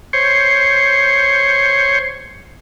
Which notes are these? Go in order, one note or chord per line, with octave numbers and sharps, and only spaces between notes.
C5 C#5